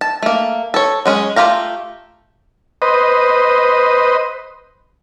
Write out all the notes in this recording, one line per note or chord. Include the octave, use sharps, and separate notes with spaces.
A5
A3 A#3
A4 C#5
F#3 G#3 C#4
A3 F4 G4 F5 A#5
B4 C5 D#5